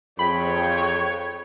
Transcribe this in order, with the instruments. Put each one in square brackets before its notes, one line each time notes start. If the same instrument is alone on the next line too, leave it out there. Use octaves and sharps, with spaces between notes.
[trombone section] F2 [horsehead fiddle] G#4 G5 [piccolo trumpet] C#5 [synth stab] B5